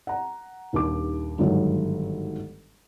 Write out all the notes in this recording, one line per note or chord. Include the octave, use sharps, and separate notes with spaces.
F#5 A#5
D#1 D#2 D4 G4 D6
G1 G#2 D#3 F#3